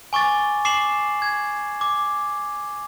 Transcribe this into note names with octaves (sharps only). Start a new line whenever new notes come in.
G#5 C#6 D6 A6
D6 C7 E7 F#7
G#6
D6